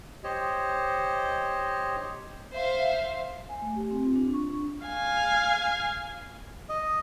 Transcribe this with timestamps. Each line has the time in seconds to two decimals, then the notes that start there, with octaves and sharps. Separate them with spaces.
0.24 G4 C5 C#5 D#5
2.52 C5 E5 F5
3.49 G#5
3.62 A3
3.76 G4
3.91 C4
4.04 F4
4.16 D4
4.34 C#6
4.48 D4
4.85 F5 G#5
6.69 D#5